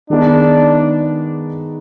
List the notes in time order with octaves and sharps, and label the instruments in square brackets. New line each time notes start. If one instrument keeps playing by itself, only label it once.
[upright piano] D#3 G#3 B3 D#4 [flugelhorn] D4